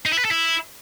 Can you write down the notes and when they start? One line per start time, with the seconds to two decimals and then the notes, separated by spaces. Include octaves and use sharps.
0.05 D#4
0.12 E4
0.18 B4
0.25 A4
0.31 E4